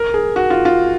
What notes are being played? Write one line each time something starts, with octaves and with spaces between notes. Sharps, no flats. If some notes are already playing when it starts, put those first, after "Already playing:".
Already playing: A#4
G#4
F#4
F4
F4